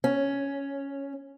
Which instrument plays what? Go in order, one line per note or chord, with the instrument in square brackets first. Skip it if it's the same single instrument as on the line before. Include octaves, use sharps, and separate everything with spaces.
[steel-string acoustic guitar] C#4